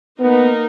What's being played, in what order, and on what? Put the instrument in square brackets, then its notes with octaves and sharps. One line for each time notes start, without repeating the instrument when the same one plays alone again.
[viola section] A#3 D#4 A#4 [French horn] B3